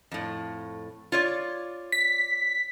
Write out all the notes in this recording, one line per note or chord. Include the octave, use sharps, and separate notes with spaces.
F2 A2
F4 C#5 D5
B6